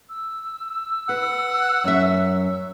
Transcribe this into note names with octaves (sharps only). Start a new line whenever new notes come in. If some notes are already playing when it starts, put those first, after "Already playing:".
E6
B4 F#5
F#2 C#4 E5